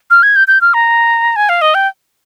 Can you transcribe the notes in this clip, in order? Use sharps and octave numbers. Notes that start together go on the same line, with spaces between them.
F6
G#6
G6
G6
F6
A#5
G#5
F5
D#5
G5